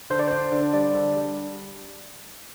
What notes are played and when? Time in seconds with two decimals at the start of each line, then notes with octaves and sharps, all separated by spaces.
0.10 D3 C5
0.19 D5
0.28 D4 C5
0.52 D3
0.73 G3 D5
0.95 D3
1.16 G3